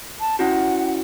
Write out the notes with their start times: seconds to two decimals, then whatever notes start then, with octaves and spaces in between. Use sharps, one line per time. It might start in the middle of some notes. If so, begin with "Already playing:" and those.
0.20 A5
0.39 C#4 E4 F#4 F#5